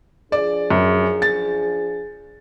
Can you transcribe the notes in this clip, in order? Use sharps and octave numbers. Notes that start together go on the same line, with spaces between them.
F3 D4 G#4 D5
F#2
A6